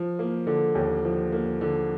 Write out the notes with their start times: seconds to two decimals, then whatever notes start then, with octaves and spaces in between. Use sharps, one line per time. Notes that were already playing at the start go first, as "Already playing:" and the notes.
Already playing: F3
0.19 A#3
0.47 D3
0.75 D#2
1.05 F3
1.32 A#3
1.61 D3